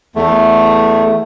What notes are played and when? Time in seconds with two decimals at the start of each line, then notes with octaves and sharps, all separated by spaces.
0.16 E2 A3